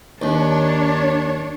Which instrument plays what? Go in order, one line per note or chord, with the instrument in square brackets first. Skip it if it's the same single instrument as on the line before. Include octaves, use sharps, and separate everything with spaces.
[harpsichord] D#2 [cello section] D4 C#5